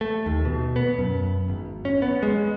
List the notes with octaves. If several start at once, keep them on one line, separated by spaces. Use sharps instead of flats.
A3
D#2
B2
B3
F#2
G#1
C#4
B3
G#3